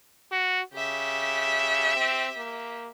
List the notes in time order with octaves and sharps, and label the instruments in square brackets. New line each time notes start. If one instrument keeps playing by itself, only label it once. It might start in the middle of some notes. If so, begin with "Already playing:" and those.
[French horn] F#4
[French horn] C#3 [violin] G4 E5
[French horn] C4
A#3